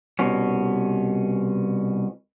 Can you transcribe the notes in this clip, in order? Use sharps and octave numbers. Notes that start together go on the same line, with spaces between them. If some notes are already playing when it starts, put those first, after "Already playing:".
C2 B2 C#4